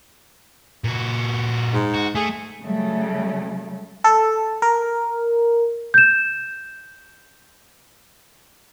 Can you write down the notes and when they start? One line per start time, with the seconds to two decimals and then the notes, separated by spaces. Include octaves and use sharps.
0.84 A#2 F#4
1.74 G#2
1.94 F#4
2.15 A3 G#4
2.62 C#3 F#3 G3 A3
4.04 A4
4.62 A#4
5.94 G6 E7